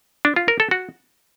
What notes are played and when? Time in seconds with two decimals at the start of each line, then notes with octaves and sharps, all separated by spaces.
0.25 D4
0.36 F4
0.48 A#4
0.60 A4
0.71 F#4